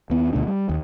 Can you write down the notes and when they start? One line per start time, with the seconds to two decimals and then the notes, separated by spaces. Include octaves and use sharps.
0.10 D#2 B3
0.33 D2 B2 A3 D4
0.47 G3
0.69 D#2